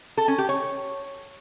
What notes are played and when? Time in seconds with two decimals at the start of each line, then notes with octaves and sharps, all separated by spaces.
0.17 A4
0.28 C#4
0.38 G4
0.49 C#5